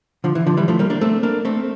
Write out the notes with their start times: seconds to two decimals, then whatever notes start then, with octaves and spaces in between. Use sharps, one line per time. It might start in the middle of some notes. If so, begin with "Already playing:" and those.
0.24 D3 F3
0.35 E3
0.46 D3 F3
0.57 E3 G3
0.68 F3 A3
0.79 G3 A#3
0.90 A#3 D4
1.01 A3 C4
1.23 A#3 D4
1.45 A3 C4